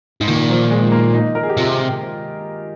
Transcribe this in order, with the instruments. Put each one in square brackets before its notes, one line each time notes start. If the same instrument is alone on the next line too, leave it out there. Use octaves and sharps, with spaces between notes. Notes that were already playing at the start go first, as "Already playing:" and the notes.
[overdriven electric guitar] G#2
[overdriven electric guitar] A#2 [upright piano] D#3
[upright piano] F3
G#3
A#3
D#4
A#4
G#4
G4
[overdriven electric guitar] C3 [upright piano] F4